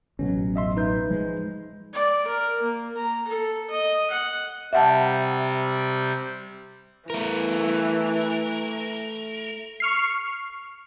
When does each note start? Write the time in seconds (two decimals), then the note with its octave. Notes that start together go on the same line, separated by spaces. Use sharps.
0.19 A1 B2 F#3 C#4
0.56 D#5 E5 C6
0.76 D#4 B4 G6
1.10 F3 G#3
1.93 D5
2.27 A#4
2.61 A#3
2.97 A#5
3.28 A4
3.70 D#5
4.11 F#5
4.73 C3 G3 E5 F#5 A5
7.10 E3 A3 A#4
9.80 C#6 F6 C7